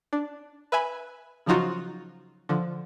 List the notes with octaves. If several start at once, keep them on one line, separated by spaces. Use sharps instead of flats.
D4
B4 E5 G#5 B5
C#3 F3 F#3 D#4 F4 F#4
D3 F3